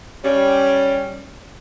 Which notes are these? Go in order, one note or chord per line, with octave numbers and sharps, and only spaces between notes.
G3 C#4